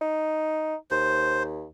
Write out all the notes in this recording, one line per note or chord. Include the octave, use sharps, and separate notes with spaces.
D#4
D#2 C5